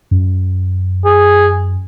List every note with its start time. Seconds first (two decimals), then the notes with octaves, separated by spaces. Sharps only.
0.11 F#2
1.05 G#4